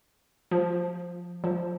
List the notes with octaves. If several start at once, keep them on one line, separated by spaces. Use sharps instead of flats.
F3
F3